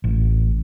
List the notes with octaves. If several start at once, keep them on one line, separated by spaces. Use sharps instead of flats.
A1